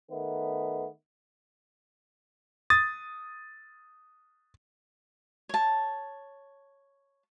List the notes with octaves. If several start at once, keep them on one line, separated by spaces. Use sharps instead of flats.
D#3 A3 B3
D#6 A6
C#5 A5